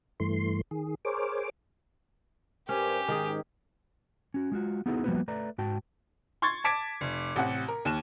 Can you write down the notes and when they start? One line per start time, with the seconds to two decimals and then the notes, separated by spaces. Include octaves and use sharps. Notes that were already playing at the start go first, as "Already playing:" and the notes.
0.20 G2 E3 A3 C6
0.71 D#3 G#4
1.05 G#4 A#4 C5 C#5 D6
2.69 G2 C#4 G4 A#4 C5 G#5
3.08 G#2 D#3 D#4 G#4
4.34 C#4 F#4
4.52 G#3 F4 F#4
4.86 B3 D#4 E4 F#4 G#4 A4
5.04 F3 G3 A#3 B3 F#4 B4
5.28 A3 B4 D5 A#5
5.58 G#2 F#4 G5 A5
6.42 C6 C#6 G#6 A6
6.64 A5 D6 G#6 B6 D7
7.01 F1
7.36 A1 C3 F#5
7.68 A#4
7.85 D#2 E7